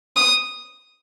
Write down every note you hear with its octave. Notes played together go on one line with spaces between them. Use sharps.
D#6